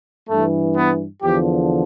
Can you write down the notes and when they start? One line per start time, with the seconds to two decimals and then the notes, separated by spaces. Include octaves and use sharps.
0.29 G2 E3 A3
0.76 B3
1.23 E2 D3 F3 G4